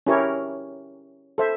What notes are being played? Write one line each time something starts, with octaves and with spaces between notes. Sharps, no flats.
C#4 E4 G4 A#4 C#5
A4 C5 E5